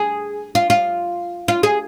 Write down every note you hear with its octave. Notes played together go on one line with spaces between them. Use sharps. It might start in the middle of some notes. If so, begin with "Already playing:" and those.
Already playing: G#4
F4
F4
F4
G#4